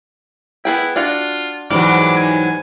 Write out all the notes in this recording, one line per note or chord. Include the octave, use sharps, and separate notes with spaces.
B3 E4 G#4 G5
D4 F4 F#4 F5
G#2 E3 F#3 G3 D6
G#5